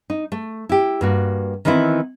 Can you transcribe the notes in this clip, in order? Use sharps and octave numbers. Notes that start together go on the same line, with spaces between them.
D#4
A3
E4 G4
G2 A#3 F#4
D#3 E3 B3 C4 E4